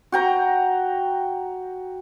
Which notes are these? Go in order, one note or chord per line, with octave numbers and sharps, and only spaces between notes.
F#4 G5 A#5